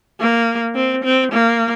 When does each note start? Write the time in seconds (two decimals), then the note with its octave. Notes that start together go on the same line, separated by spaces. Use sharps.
0.19 A#3
0.75 C4
1.04 C4
1.32 A#3